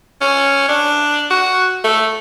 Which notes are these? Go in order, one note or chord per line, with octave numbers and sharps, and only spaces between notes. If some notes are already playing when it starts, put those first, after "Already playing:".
C#4
D4
F#4
A3